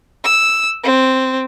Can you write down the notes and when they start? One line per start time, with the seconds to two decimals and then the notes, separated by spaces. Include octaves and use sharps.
0.24 E6
0.84 C4